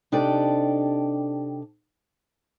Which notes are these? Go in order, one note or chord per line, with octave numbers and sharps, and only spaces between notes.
C3 D4 D#4 G4 A4 D5